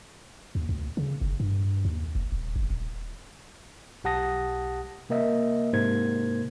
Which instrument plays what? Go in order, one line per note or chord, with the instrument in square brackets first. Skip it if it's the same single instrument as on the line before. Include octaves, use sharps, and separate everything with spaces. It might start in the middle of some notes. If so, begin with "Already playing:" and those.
[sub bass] D#2
D2
C#3
F#1
G2
D#2
F1
D#1
G1
D#1
[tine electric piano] B1 G4 F#5 A5 D#6 A#6
C3 A#3 A#4 D#5 E5
G#2 C3 A#3 A#4 C5 G#6